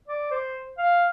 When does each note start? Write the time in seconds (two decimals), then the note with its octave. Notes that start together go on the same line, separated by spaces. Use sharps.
0.08 D5
0.31 C5
0.78 F5